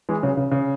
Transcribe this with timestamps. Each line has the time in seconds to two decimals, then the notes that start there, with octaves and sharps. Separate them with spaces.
0.09 E3 G#3
0.23 C#3 F#3
0.37 C#3
0.51 C#3